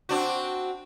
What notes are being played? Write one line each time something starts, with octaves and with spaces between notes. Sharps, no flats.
C4 D4 F#4